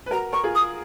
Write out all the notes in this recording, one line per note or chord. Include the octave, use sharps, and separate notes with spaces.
B4
F#4 A#4 A#5
A#4 C#6
F4 G#4
D#6